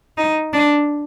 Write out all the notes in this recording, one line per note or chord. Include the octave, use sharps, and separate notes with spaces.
D#4
D4